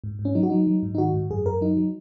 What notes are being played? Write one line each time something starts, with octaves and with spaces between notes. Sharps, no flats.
G#2
G#2
C#4
F#3 D#4
F#4
F#3 D#4
F#3
G#2
D#4
D#3 F#4
G#2
F#2 G#4
F#2 A#4
F#3 D#4
F#3